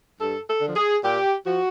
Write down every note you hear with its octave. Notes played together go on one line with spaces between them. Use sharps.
G2 A4
A4
D3
F3
G#4
A#2 G4
F3 F#4